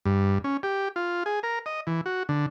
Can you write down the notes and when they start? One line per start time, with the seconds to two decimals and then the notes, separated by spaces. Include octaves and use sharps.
0.06 G2
0.44 C#4
0.63 G4
0.96 F4
1.26 G#4
1.43 A#4
1.66 D#5
1.87 E3
2.06 F#4
2.29 D3